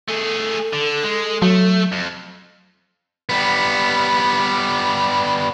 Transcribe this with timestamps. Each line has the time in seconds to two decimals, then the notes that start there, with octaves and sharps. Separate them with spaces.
0.08 A3 G#4 A4
0.73 D3
1.03 G#3
1.42 F#3 A3
1.92 F2
3.29 G3 B3